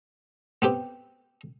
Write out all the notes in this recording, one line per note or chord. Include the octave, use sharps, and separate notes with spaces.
B3 C4 G4